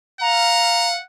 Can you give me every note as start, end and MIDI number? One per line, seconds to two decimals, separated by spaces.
0.21 0.96 77
0.21 1.03 78
0.21 0.88 82